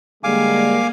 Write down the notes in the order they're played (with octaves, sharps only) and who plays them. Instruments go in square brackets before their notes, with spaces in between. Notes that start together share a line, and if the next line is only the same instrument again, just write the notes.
[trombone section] D3 G3 G#3 [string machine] A#3 [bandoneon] F5 G#5 D6